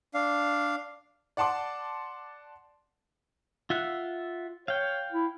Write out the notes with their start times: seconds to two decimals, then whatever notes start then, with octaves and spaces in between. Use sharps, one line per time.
0.14 D4 F5
1.37 D5 F#5 A5 C6 D6
3.70 F4 E5 F#5
4.68 C#5 F5 G5
5.12 E4